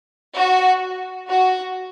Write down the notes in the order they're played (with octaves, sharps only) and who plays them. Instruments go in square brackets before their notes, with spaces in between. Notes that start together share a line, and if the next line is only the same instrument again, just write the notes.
[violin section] F#4
F#4